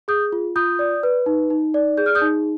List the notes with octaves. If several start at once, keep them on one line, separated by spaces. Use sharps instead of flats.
G#4 D#6 G6
F4
F4 D#6 G6
D5
B4
D#4
D#4
D5
G#4 G6
F6
D#6 G6
D#4